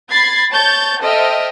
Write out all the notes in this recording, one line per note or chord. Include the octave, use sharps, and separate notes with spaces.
B5 G#6 A6 C7
C#5 A5 G6 A6
A4 C5 D#5 E5 G5 F6